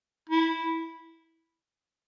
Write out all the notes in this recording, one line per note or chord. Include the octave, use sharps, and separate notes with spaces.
E4